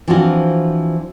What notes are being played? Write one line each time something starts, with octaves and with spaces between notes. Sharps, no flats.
E3 F3 C4 D4 F4 F#4